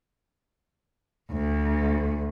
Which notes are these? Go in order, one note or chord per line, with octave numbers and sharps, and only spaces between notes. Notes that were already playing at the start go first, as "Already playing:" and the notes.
D2